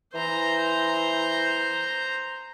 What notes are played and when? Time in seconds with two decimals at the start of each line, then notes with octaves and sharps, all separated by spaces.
0.14 E3 C5 A#5